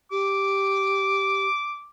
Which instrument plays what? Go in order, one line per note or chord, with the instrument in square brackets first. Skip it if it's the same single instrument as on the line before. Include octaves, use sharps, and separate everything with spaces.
[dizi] G4 [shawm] D6